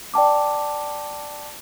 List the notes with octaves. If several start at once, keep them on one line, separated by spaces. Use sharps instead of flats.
D5 G5 A5 D6